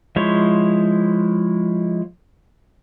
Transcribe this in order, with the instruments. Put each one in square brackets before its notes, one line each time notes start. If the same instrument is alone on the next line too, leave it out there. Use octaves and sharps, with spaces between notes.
[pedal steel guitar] F3 G#3 E4 C5 C#5